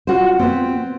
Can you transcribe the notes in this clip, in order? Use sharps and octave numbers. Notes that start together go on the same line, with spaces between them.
F4 F#4 C5
B3 C4